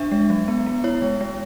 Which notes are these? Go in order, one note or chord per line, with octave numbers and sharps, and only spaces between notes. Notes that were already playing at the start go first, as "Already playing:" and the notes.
Already playing: D4 E5
G#3
F#3
B3
B3
E4 C#5
G#3
G#3